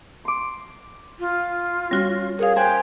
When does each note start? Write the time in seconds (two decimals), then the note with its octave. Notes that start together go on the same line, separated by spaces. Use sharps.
0.25 C6 D6
1.19 F4
1.91 G3 C#4 F#4 A#6
2.39 G#4 A#4 C#5 F5
2.56 C5 G5 G#5 F#6